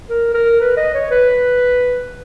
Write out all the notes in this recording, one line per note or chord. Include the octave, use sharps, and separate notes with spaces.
A#4
A#4
B4
D#5
C#5
B4